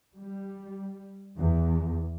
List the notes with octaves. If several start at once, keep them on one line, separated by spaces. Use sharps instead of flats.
G3
E2